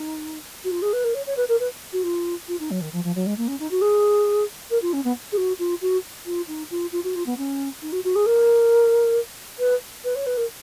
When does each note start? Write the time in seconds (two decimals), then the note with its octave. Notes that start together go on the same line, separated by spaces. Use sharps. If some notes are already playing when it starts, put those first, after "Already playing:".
Already playing: D#4
0.64 F#4
0.71 F4
0.82 G#4
0.93 B4
1.04 A#4
1.14 C#5
1.27 C#5
1.37 B4
1.49 A#4
1.60 B4
1.93 F#4
2.03 F4
2.48 F4
2.60 D#4
2.71 F#3
2.81 D#3
2.93 F3
3.04 F3
3.15 F#3
3.26 G#3
3.37 A#3
3.48 C#4
3.60 D#4
3.71 F#4
3.81 G#4
4.70 A#4
4.82 F4
4.93 C#4
5.04 B3
5.32 G#4
5.37 F#4
5.59 F4
5.82 F#4
6.26 F4
6.48 D#4
6.71 F4
6.92 F4
7.04 F#4
7.15 F4
7.26 B3
7.38 C#4
7.82 D#4
7.92 F#4
8.04 F#4
8.15 G#4
8.26 A#4
9.59 B4
10.04 B4
10.15 C#5
10.26 B4
10.37 A#4